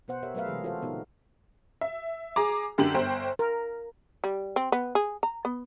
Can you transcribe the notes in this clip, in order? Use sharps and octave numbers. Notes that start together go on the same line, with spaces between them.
B2 B3 C5 F#5
G4 A#4 B4 C#5 E5
F#3 A3 A#4 B4 E5 F5
C3 E3 G#3 G#4
F4 F#4 A4 C5 F5
A#2 C#3 B3 D#4 G4 A#4
E5
G#4 A#5 D6
F#2 D3 G4 F#7
G1 C5 G5
A#4
G3
C4
B3
G#4
A#5
B3